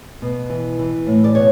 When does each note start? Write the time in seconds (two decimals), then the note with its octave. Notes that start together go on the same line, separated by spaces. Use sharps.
0.22 B2
0.50 E3
0.79 E3
1.07 A2
1.24 D5
1.35 B2 C#5